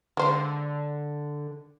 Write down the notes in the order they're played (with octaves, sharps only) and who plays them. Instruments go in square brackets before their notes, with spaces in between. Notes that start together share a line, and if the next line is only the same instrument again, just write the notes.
[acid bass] D3 [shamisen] G#3 C5 F5